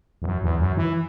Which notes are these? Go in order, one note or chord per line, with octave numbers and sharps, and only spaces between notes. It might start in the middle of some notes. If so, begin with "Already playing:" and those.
E2
F#2
E2
F#2
E3